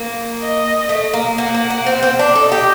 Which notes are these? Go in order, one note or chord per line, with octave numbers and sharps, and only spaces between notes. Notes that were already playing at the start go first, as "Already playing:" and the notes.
Already playing: A#3
D#5
A3
A#3
A#3 F#5
A#3
A#3
C4
C4
D4
A4 D#5
G4